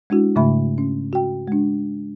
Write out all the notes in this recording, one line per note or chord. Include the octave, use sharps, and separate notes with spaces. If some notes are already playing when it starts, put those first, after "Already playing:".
G#3 D4 E4 F#4
G#2 C#3 A3 E5 B5
C#4
F#4 G5
G#3 D4